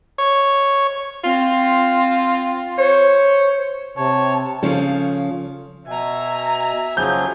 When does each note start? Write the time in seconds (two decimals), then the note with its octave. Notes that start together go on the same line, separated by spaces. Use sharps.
0.18 C#5
1.24 C4 F4
2.78 C5 C#5
3.98 C3 C#5 A5
4.63 C#3 F3 C#4 A4
5.86 B2 E5 G#5 A#5
6.97 C#3 F3 F#3 G#5 G6